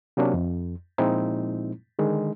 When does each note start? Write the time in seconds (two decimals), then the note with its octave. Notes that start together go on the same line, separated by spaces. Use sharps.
0.17 C3 F#3 A#3 C#4 D4
0.34 F2
0.98 A#2 F3 G#3 C4 D#4 E4
1.99 D3 D#3 G#3